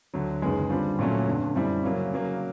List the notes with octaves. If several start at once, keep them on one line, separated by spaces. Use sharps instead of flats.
D2 D3 F#3
F#1 F#2 D#3 G#3 B3
D3 G3 C4 F4
A#2 F#3 A3 C#4
G1 F2 D3
F#2 D3 G3 C4 E4
C#3 F#3 A#3 C#4
C#3 F#3 A#3